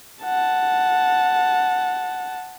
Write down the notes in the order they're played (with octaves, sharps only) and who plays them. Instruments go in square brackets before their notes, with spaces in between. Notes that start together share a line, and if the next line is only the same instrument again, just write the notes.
[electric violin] F#5 A5